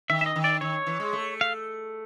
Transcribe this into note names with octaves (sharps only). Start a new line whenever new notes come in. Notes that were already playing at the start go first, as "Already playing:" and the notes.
D#3 E5
E5
D#5
D#3
D5
D#3 C#5
E3
G#3
A3
F5